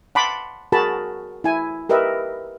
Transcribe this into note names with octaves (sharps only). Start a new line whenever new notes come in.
F#5 A5 B5 C6 D6
F#4 G#4 A#4 A5 B5
E4 G#5
G4 A#4 B4 D#5 E5